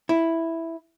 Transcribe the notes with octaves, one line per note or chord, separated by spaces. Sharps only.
E4